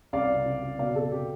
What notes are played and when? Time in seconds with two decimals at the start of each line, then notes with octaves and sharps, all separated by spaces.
0.13 C2 D5 F5
0.29 C3
0.45 C3
0.63 C3
0.79 B2 D5 F5
0.95 B2 A4
1.12 B2 G4